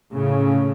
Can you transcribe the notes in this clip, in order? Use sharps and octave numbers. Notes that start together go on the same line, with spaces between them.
A2 C#3